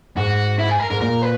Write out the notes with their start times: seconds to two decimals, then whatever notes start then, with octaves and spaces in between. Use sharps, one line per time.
0.17 G#2 F#4
0.59 E4
0.70 G#4
0.80 A#4
0.90 G#2 A#4
1.01 A#2 A#4
1.22 B4